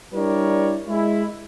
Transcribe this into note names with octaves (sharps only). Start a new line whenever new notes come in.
G3 D4 E4 A#4 C#5 D5
G#3 E4